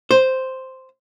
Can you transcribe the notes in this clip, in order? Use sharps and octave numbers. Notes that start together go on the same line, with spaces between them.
C5